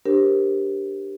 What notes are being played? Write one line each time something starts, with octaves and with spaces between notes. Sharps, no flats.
D4 G4 A#4 C5